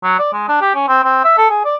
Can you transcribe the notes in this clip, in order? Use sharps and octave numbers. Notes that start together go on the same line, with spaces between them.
F#3
D5
G#3
D4
G4
C#4
C4
C4
E5
A4
G#4
D5